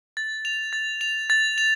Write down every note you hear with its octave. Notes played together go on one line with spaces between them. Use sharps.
A6
F7
A6
F7
A6
F7